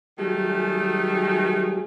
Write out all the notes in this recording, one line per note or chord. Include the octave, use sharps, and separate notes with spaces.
D#3 F#3 G3 A3 G#4